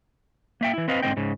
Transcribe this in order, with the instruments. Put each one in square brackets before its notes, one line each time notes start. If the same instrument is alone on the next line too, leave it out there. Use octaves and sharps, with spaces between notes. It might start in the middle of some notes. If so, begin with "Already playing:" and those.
[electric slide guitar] A#3 E5 G5
E3 E4
C4 B4 D#5 F5
G#2 D3 F3 C4 D#5 G5
G#2 C#3